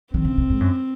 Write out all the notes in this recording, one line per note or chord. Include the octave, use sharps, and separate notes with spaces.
D#3 C4
C#3
C3
G#2
F#2